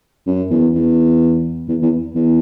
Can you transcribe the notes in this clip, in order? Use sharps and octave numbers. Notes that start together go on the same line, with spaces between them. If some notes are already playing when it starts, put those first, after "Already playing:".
F#2
E2
E2
E2
E2
E2